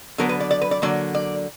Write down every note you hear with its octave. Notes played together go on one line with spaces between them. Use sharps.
D3 F#3 B3 A#4
B4
D5
D5
B4
D5
D3 F#3 A#3 D5
D5